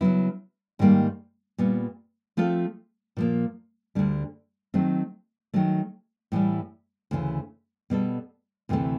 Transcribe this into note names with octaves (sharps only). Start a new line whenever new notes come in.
C#3 F#3 B3 E4
G#2 D#3 G3 A#3
A#2 G3 B3
F3 A3 C4 F4 A4
A#2 F3 A#3
D2 D3 G3
D#3 F#3 A3 C4
D#3 F#3 A3
A2 E3 G3
D2 C#3 E3
B2 G3 B3 E4 A4
D2 C3 E3 A3